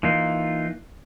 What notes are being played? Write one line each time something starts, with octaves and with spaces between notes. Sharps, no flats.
E3 A#3 D#4 F4